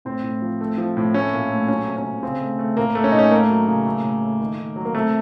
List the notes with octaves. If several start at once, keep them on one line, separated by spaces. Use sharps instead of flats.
A2 C4
A2
F3
A3
F3
A2
A3 C#4
A#2
A3
F#3 C#4
C3
C#4
C3
C#3 C4
A3
A3
A2 A#3
A3
C#4
A2 D#4
C#4
A3 A#3
F#3
C#3
A3
A2
A3
D#3
D#3
F#3
A#3
C3 A3